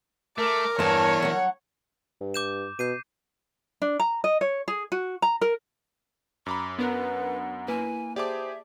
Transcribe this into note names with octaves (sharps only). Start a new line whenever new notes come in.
A3 A#4 D6
E2 G2 C#5 A5
F#3 F#5
G2
D6 G6 E7
B2 G6 C7 D#7
D4
A#5
D#5
C#5
G#4
F#4
A#5
A#4
F#2 A#5 B5 D6
B3 D4 A#4 B4 F#5
A#3 E4 B4 G#5
G4 G#4 C5 D5 E5 A5 D6